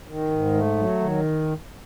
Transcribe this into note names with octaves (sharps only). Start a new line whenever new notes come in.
D#3
G#2
A3
F#3
D#3